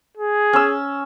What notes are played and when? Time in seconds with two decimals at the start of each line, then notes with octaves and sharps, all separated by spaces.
0.17 G#4
0.53 C#4 E6